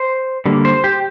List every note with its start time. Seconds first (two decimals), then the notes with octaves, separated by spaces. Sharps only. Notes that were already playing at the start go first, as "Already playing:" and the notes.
Already playing: C5
0.46 D3 G3 A#3
0.65 C5
0.84 G4